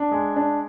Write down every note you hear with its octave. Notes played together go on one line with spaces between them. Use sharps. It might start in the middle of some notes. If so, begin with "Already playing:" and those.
Already playing: D4
G#3
D4